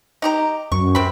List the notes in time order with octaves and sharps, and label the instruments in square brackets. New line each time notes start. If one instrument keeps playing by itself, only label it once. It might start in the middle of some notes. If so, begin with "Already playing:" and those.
[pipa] D#4 G4 A#5
[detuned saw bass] F#2 [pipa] C#6
[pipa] C3 C4 B5